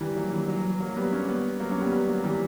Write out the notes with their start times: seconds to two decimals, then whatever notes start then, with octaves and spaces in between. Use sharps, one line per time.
0.01 E3 G3
0.16 F#3 A#3
0.33 E3 G3
0.48 F#3
0.65 F#3
0.80 F#3 A#3
0.97 G3 B3
1.12 A#3 C#4
1.28 G3 B3
1.60 F#3 A#3
1.71 A#3 C#4
1.81 G3 B3
1.92 G3 B3
2.08 F#3 A#3
2.24 E3 G3